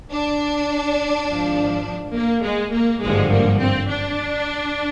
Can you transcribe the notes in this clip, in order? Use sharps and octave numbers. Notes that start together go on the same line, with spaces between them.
D4
G#1 G#2 F3
A#3
G#3
A#3
G#1 G2 D3 F3 G#3
A#3
C4
D4